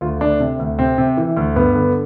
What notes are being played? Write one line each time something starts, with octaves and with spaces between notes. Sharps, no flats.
D2 F4
D2 D4
C3
D2
C3 C4
C3
E3
D2
G2 B3
D3